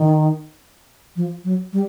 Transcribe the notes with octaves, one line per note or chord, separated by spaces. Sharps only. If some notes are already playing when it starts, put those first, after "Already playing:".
Already playing: D#3
F3
F#3
G3